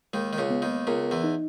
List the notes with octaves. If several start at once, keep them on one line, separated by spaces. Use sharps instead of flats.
D#2 D#3 G#3
D#3
C#2 C#3
B3
D#2 D#3
C#2 C#3 A#4
E2 E3
D#4